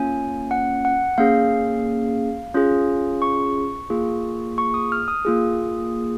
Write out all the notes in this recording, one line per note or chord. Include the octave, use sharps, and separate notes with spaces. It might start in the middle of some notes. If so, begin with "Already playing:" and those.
Already playing: A#3 C#4 F4 G#5
F#5
F#5
A#3 C#4 G#4 F5
C#4 F4 G#4
C#6
A#3 F4 G#4
C#6
D#6
F6
D#6
A#3 F4 G#4